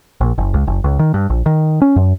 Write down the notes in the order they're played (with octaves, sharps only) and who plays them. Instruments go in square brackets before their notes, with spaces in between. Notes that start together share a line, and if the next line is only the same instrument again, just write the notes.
[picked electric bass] A#1
F#1
C#2
F#1
C#2
D#3
G2
A#1
D#3
C#4
F#2